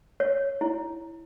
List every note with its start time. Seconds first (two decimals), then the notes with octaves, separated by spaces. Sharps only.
0.20 C#5
0.61 E4